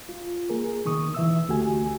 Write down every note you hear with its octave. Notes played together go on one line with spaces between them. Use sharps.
F4
A#3 G#4 A#4
B2 D#3 C#6 D#6
E3 E5 E6
D2 A3 F#4 G4 G#5